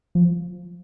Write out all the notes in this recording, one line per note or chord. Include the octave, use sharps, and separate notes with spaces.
F3